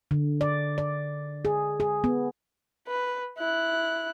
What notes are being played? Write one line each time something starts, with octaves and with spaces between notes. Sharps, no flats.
D3
D5
D5
G#4
G#4
B3
B4
E4 F#6